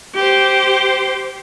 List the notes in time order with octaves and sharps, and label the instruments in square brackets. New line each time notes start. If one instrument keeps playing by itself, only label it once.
[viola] G4 C5